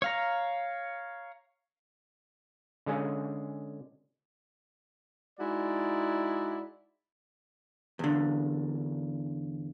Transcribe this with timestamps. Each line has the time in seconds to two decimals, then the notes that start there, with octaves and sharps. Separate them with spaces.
0.02 C#5 F5 A#5
2.86 D3 G#3 C#4 G#4
5.40 G#3 D#4 E4 F#4 D5
7.99 E2 D3